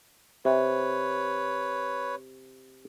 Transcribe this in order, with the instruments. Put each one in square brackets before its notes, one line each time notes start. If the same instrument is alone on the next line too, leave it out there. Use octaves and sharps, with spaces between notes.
[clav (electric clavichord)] C3 [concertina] B4 C#5